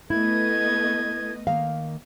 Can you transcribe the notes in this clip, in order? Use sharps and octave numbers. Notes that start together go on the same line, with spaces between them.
A3 B3 E4 D#5 G#6
D#3 A#3 F5